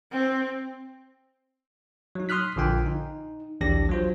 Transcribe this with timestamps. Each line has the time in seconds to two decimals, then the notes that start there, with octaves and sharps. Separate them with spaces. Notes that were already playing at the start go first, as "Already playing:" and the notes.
0.11 C4
2.15 F#3 D#4
2.29 C6 D#6 F6 F#6 B6
2.56 A#1 D3 F4 G5 G#5
2.86 D#4
3.61 A#1 D#2 E3 D4 G4 A#6
3.89 F#3 F4 C5